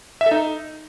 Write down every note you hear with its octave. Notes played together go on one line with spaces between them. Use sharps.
E5
A4
D#4